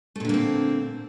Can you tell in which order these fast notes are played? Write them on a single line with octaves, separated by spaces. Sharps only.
A3 A#2 D3 A#3 C4